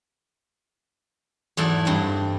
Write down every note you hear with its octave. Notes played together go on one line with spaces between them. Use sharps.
E2 G#2 F#3 A3 E4 D5
G2 C4 D#4